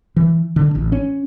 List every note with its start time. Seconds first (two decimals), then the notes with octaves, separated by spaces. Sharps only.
0.16 E3
0.56 D3
0.75 A1
0.92 C#4